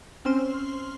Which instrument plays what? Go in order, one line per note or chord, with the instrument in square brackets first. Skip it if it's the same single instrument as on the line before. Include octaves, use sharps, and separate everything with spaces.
[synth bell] C4 C#4 C5 C6 F6